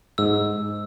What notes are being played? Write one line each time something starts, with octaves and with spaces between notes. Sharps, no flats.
G#2 E6